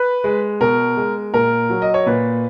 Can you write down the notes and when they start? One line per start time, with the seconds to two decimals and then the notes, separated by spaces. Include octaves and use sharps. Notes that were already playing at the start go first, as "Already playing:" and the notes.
Already playing: B4
0.24 G#3
0.61 B2 A#4
0.97 G#3
1.34 A#2 A#4
1.70 F#3
1.82 D#5
1.94 C#5
2.06 A#2 B4